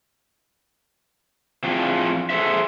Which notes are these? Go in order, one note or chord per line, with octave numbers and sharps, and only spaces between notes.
F3 C4 D4 E4 F4 G#4
G#4 A4 C5 E5